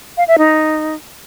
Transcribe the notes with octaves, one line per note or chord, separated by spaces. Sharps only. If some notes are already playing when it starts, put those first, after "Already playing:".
F5
E5
D#4